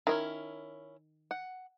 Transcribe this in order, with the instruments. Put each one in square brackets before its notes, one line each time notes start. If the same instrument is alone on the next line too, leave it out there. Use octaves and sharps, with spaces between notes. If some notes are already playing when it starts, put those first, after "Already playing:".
[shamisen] D#3 [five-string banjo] C#4 E4 A#4
[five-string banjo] F#5